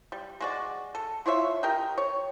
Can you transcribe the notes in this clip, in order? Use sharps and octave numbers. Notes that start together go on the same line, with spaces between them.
G3
G#3 F#4 D5
A4
E4 F4 C#5 E5
G4 A#4 D#5 G5
C#5